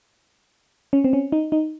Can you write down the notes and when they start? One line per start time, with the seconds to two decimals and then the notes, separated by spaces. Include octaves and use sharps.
0.93 C#4
1.04 C4
1.13 C#4
1.32 D#4
1.52 D#4